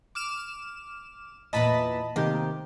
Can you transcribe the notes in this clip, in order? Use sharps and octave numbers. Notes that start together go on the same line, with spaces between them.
D6 F6 E7
E2 A#2 E3 D#5 A5 B5
C3 D#3 A#3 G4